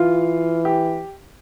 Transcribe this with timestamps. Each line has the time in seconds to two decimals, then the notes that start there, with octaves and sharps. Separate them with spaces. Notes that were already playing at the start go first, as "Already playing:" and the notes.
Already playing: E3 F4
0.65 G4